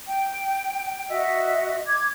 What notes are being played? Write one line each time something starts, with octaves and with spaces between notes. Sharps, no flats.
G5
F#4 D#5 E5
D6 G#6